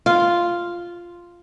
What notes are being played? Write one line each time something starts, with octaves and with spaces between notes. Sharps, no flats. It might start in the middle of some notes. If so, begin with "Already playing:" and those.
F4